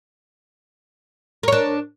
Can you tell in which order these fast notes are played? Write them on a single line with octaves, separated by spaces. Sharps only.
A#4 C#5 D4